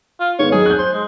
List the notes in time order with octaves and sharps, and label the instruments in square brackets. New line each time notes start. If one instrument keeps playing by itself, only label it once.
[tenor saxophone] F4
[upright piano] G#2 D#3 B3 [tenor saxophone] C#5
[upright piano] F#3 D#4 [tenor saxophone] G#4
[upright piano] F#6 G6
[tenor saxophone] C5
G#3